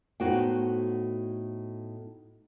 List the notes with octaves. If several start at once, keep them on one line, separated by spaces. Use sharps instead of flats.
A2 B3 D#4 F#4 C5 G5